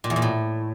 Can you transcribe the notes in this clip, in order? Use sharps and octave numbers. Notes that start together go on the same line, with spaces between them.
A#2
E2
A#2
A2